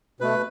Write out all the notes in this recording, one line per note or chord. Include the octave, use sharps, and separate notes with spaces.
B2 A3 B4